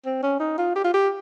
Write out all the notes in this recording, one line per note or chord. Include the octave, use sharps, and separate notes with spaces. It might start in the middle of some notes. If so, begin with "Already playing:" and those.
C4
C#4
D#4
F4
G4
F4
G4